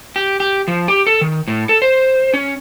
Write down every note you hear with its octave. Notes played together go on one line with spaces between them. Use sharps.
G4
G4
F3
G4
A4
D#3
A2
A4
C5
C#4